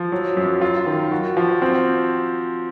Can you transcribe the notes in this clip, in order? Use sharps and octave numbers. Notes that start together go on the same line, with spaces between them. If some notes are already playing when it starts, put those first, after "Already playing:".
Already playing: F3
F#3
F#2
F4
D#3
F#4
F3
C4